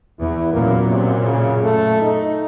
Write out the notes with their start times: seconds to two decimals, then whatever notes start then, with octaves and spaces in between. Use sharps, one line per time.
0.21 E2 E4
0.53 F#2 A#2 A#3
0.89 C3
1.24 C#3
1.64 A3
2.02 D#4